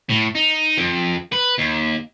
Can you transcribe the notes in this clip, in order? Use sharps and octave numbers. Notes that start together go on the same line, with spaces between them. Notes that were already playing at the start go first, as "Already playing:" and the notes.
A2
D#4
F2
B4
D#2